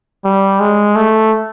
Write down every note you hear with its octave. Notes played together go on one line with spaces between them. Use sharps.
G3
G#3
A3